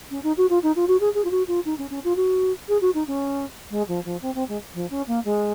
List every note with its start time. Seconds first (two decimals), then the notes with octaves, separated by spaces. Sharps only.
0.10 C#4
0.23 D#4
0.37 F#4
0.49 F4
0.62 D#4
0.75 F4
0.87 F#4
1.00 G#4
1.14 G#4
1.24 F4
1.30 F#4
1.47 F4
1.65 D#4
1.78 C#4
1.90 C#4
2.04 F4
2.15 F#4
2.68 G#4
2.81 F#4
2.94 D#4
3.07 C#4
3.70 G#3
3.87 F3
4.04 F3
4.21 C4
4.34 C4
4.48 G#3
4.74 F3
4.90 C#4
5.07 A#3
5.24 G#3